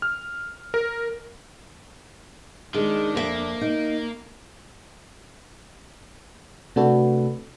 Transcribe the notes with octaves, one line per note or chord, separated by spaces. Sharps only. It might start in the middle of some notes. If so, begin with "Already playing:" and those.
F6
A#4
D#3 G#3 D4
F2 A#3 F4 E5
D#4
C3 A3 D4 F#4 A4 B4